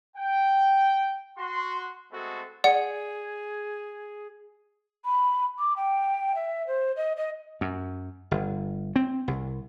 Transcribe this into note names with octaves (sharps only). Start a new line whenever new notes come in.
G5
F#4 C6
G#3 A3 B3 C4 F#4 A4
G#4 D5 F#5 C#7
B5
D6
G5
E5
C5
D#5
D#5
F#2
G1
C4
C2